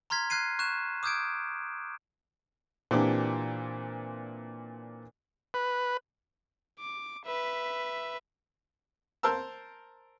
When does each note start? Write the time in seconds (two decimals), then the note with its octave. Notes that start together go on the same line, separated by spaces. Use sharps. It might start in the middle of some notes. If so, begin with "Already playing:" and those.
0.10 A#5 C6 F6 G#6 B6
0.30 F6 F#6 G#6 C7 D#7
0.59 C#6 F#6 G6 E7
1.03 D6 D#6 F6 G6 G#6 D7
2.91 A#2 E3 C4 D4 G4 D6
5.54 B4
6.80 D6
7.25 B4 E5
9.23 A#4 C5 A5 E6